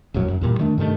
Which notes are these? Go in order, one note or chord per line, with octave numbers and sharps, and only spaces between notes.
E1 A#1 F#2 F#3
F#2
E2 A#2 G3
D#3 A3 D4
G2 C3 D#3 A3